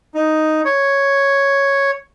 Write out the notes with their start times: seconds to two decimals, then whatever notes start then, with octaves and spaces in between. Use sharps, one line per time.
0.15 D#4
0.65 C#5